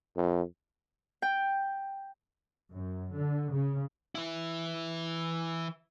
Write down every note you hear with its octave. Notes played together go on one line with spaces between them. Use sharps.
F2
G5
F#2
D3
C#3
E3 E4